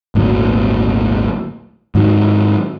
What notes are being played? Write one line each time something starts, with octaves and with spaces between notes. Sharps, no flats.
G#1 D2 A#2 F#3
G#2 D#3 F#3